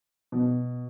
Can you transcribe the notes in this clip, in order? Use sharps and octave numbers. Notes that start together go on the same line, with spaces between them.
B2